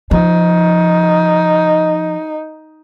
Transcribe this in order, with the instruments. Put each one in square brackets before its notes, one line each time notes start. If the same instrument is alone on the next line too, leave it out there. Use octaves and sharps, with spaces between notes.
[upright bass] F3 [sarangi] D#4